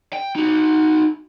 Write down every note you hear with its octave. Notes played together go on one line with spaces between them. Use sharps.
G5
D#4 F#4